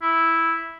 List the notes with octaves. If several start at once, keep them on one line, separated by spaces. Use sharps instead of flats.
E4